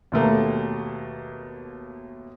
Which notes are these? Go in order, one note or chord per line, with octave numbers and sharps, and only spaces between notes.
D#2 B2 A3 A#3